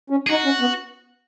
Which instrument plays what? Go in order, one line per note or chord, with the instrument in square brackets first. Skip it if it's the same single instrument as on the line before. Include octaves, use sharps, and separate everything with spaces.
[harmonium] C#4
[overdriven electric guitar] G#4
[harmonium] D#4 [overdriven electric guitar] F#4
[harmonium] C#4
B3